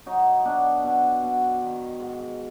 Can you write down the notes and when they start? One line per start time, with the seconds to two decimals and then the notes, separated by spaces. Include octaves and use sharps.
0.06 F#3 D#4
0.45 B2 D4
0.84 B2
1.23 B2
1.61 D#3
1.99 G#2